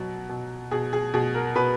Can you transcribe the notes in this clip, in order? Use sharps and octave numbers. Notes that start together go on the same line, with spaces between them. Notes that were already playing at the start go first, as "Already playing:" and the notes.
Already playing: B2 F#3
B2
B2 G#4
G#4
B2 G#4
A#4
B2 B4